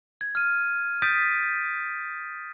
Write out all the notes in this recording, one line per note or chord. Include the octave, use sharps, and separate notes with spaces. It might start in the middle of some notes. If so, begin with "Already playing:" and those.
G#6
F6 D#7
D#6 G6 A6 B6 D7 D#7